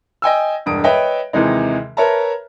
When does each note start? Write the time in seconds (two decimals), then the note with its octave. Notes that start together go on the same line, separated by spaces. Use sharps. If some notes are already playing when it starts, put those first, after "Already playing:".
0.22 D#5 G5 G#5 E6
0.66 E1 G2 D#6 D7
0.84 B4 C#5 D#5 E5 G5
1.33 D#2 C3 E3 G#3 D#4
1.97 A#4 B4 C#5 E5 A5 A#5